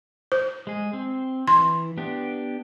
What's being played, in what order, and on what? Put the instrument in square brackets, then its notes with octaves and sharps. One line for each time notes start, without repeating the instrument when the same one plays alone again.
[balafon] C5
[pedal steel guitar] G#3 G#4
C4
[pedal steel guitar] E3 [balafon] C6
[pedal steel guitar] B3 D4 G4